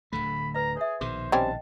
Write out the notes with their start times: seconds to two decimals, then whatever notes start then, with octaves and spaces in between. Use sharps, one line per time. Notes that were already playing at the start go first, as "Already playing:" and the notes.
0.13 D1 D3 A3 B5
0.55 B4 D5 A#5
0.77 G#4 C#5 E5
1.01 A#1 B2 D#3 G#4 C5
1.32 G3 C4 C#4 D#5 G5 A5